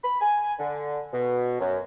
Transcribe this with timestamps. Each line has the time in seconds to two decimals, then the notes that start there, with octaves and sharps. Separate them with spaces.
0.04 B5
0.21 G#5
0.59 D3
1.13 B2
1.60 F#2